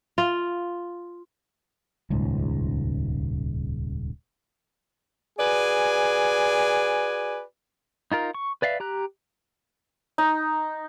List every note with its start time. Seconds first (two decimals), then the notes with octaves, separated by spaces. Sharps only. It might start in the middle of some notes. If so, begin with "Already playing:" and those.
0.18 F4
2.10 D#1 C#2 G#2
5.39 F#4 G#4 B4 D5 G#5
8.12 D#4 F4 A#4
8.35 C#6
8.62 B4 D5 E5 F5
8.80 G4 A#5 F#6
10.18 D#4